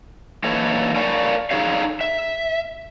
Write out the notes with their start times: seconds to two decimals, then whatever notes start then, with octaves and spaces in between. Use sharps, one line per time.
0.44 E3 A#3 D#4 A4 C#5
0.95 A#4 C#5 D5 F5 G#5 A5
1.51 D#4 G#4 A4 C#5 F5
2.01 E5